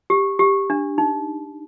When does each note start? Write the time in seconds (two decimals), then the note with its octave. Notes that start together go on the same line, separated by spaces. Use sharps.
0.10 G4
0.39 G4
0.70 D4
0.98 D#4